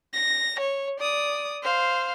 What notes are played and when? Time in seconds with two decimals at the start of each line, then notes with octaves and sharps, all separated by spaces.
0.14 A#6
0.60 C#5
1.00 D5 D#6
1.63 C5 F5